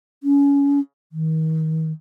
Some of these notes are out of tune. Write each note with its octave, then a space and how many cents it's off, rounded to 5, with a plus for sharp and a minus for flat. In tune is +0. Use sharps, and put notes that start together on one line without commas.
C#4 +30
D#3 +35